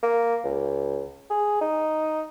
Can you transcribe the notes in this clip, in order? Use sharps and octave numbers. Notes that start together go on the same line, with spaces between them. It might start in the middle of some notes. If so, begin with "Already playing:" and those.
A#3
C#2
G#4
D#4